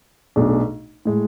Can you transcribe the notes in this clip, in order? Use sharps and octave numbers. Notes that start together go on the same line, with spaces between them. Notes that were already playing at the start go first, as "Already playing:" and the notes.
B1 B2 A3 D4 G#4
A2 G#3